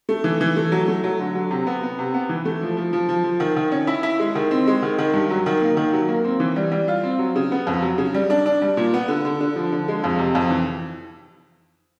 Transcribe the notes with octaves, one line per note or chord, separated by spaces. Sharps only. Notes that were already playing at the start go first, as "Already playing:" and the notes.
A3
E3
E3
A3
F#3
A3
F#3
D3
F#3
C3
B3
B3
C3
B3
E3
A3
F3
F3
F3
F3
F3
D#3
D#3
C#4
E4
E4
G#3
D#3
C4
G#3
D#3
D#3
G2
F#3
D#3
A#3
D#3
F#3
A#3
C4
E3
G3
G3
F4
C4
F#3
C#3
B3
F2
F#3
C#3
G3
D4
D4
G3
A#2
B3
D3
D3
D3
F3
D3
G#3
F2
C3
F2
E3